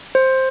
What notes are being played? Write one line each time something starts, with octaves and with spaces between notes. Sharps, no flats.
C5